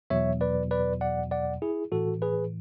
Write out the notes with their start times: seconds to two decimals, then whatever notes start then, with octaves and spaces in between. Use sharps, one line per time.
0.10 E2 B2 F#3 C#5 E5
0.41 B4 D5
0.71 B4 D5
1.01 D5 F#5
1.31 D5 F#5
1.62 E4 G#4
1.92 A2 E3 F#4 A4
2.22 G#4 B4